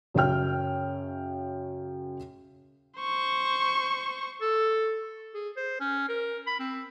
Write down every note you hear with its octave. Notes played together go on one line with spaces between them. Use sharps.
F#2 C#3 C#5 G5 F6
C5 C#6
A4
G#4
C5
C#4
A#4
B5
C4